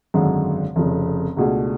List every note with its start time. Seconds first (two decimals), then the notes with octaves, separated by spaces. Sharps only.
0.14 G#1 F#2 D3 G#3
0.76 F1 F2 C#3
1.37 C#2 B2 A3 D4 G#4